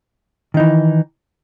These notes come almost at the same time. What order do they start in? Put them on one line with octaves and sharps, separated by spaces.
D#3 D#4 E3